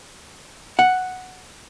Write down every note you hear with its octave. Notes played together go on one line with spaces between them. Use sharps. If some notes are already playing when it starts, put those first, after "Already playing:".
F#5